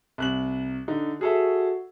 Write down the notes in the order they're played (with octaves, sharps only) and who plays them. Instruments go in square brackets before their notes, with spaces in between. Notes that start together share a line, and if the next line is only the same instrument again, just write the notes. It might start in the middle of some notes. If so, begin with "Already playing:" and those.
[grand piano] C2 F#6 F#7
D3 D#4
[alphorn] F#4 [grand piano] G#4 A4 E5